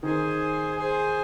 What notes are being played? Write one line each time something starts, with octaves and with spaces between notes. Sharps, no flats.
D#3 G#4 C5 G#5
G#4 C5 G#5